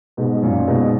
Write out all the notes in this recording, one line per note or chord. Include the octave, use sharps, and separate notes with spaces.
G#2 B2
F#2 A#2
G#2 B2